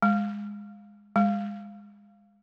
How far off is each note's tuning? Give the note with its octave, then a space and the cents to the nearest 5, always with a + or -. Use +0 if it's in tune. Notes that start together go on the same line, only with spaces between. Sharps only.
G#3 -15
G#3 -25